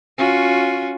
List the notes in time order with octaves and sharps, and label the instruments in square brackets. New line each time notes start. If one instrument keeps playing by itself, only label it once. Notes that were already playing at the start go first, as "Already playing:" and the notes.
[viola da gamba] C#4 F4 F#4